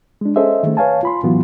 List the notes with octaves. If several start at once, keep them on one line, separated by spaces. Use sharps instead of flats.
G#3 D4
C#4 G#4 A4 C5 D#5 E5
D#3 A3
B4 C#5 F5 G#5 A5
F4 B5 C6
A2 E3 F#3 B3 F4 F#4